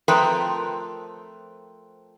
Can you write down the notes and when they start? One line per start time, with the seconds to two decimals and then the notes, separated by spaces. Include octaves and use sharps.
0.08 F3 A3 C4 A#4 B4 G5